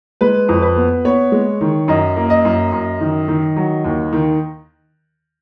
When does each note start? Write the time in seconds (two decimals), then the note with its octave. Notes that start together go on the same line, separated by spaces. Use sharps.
0.21 G#3 B4
0.49 F2
0.62 B4
0.76 B3
1.05 B3 C#5
1.32 G#3
1.61 D#3
1.88 F#2 D#5
2.16 A#3
2.30 D#5
2.45 F#2
2.73 F#2
3.00 D#3
3.28 D#3
3.56 F#3
3.84 D#2
4.13 D#3